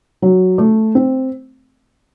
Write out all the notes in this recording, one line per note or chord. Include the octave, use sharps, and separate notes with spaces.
F#3
A3
C4